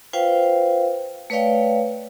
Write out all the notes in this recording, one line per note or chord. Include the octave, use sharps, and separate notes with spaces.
F4 B4 C5 F5 G5
A3 B4 C#5 D5 F5 G5